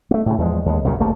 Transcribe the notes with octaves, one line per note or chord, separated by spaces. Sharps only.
A3 A#3
A2 C#3
E2 F3 G3 G#3
D#2 G#3
C2 F#2 A#2 C#3
F#1 A3 A#3